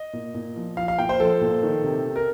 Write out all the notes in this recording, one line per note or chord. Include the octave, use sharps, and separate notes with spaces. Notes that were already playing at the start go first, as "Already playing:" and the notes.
Already playing: D#5
A#2
A#2
F3
F3 F5
F5
A#2 G5
C5
F3 A4
A#2
D#3
C3
C3
A#4